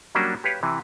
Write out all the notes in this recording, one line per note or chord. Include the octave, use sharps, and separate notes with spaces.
F#3 G3 A#3 C#4 D4 F#4
G4 B4 C#5 F5
C3 E3